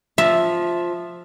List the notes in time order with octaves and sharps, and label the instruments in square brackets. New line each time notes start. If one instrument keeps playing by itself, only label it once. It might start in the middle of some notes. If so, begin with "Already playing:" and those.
[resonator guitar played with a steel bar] F3 [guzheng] E5